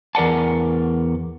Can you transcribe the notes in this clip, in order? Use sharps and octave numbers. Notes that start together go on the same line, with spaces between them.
E2 A#4 D5 F#5 A5